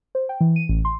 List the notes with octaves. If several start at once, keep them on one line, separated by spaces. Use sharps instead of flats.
C5
G5
E3
D#7
A1
C6